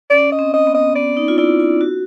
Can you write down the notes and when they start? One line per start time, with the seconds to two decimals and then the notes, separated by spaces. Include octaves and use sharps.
0.10 C#4 D5
0.32 D#5
0.39 C4
0.54 D#5
0.67 B3
0.74 D#5
0.95 B3 D5
1.17 D#4
1.28 F4
1.38 E4 D5
1.60 F4
1.81 F#4